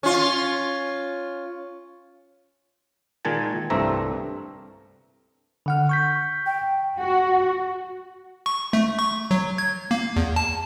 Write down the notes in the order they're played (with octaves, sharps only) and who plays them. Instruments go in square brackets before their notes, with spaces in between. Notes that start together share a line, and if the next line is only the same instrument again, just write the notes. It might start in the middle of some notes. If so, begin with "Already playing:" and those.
[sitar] C#4 F4
[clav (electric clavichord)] A#2 D#3 G#3 G#5 A5
C2 G2 A3 C4 E5 A#5
[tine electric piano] D3 F#5 F6
C#6 G6 B6
[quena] G5
[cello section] F#4
[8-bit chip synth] C#6
A3
C#6
F#3
G#6
A#3
E2
A5